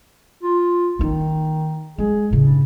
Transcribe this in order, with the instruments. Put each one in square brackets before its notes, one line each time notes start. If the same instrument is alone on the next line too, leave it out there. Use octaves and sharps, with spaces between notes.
[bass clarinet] F4
[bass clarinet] D#3 [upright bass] A#3 D#4
[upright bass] G#3 [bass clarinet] G#4
[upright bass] A2 C#3
[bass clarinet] G2